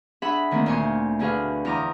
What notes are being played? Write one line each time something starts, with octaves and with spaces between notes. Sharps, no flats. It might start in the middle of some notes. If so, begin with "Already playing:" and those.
D4 G#4 E5 F#5 B5
D3 D#3 A3 A#3 C4
D2 A#2 A3 C5 G#5 C#6
B2 D3 G#4 B4 F5
E2 F3 A#5 D6 D#6